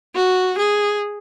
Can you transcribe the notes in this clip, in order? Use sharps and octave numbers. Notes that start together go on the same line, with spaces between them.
F#4
G#4